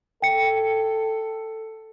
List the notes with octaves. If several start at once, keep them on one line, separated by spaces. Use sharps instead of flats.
A4 G5 C#7